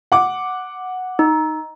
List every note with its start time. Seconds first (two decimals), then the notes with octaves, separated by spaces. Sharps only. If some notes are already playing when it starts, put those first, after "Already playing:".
0.12 F#5 D6
1.19 D#4